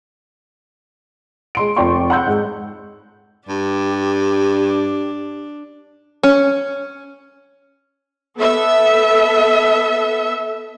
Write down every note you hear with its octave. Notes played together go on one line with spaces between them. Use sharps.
G#3 C6 D7
F1 F4 D5 G5 C6 C#6
F#5 B5 C6 E6 G6
G#2 G#3
G2 D4 G4
C#4
B3 A4 E5